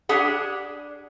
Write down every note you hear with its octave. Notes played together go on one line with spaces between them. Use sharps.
D4 G4 G#4 F#5